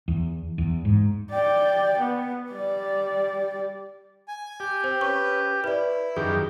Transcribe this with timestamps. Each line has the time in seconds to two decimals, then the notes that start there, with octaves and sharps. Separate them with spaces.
0.08 E2
0.58 E2
0.85 G#2
1.30 D5 G5
1.99 B3
2.51 G3 D5
4.28 G#5
4.60 G4
4.84 C4 C5
5.01 C#4 B4 C#6
5.64 E4 B4 D5
6.16 F#2 D#3 G4 G#4